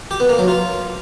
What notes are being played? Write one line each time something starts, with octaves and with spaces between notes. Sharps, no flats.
G4
B3
A#3
F#3
F4